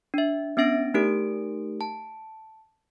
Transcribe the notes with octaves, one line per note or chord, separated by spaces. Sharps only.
D4 E5
B3 C#4 D4 E5 A#6 D7
A3 D#4 G4 A#4 D7
A5